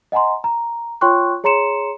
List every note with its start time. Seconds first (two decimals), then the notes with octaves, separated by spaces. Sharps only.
0.12 D#5 F#5 G#5 A#5 C6
0.44 A#5
1.01 F4 C#5 G5 C6 C#6 F#6
1.44 G#4 C#5 A#5 C6 C#7 E7